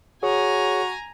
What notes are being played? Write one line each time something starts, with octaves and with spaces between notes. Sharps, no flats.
F#4 G#4 C#5 G#5 A#5